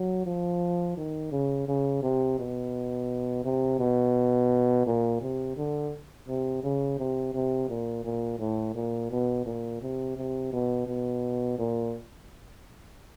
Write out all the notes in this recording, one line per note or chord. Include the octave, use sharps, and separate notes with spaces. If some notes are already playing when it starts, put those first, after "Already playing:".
Already playing: F#3
F3
D#3
C#3
C#3
C3
B2
C3
B2
A#2
C3
D3
C3
C#3
C3
C3
A#2
A#2
A2
A#2
B2
A#2
C3
C3
B2
B2
A#2